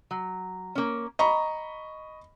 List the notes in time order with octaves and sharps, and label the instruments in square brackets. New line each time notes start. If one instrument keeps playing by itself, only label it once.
[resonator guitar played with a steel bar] F#3
A#3 C#4
[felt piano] D#5 B5 C#6 [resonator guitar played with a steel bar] A#5